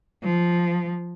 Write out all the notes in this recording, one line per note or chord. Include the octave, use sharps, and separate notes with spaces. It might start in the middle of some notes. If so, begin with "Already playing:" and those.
F3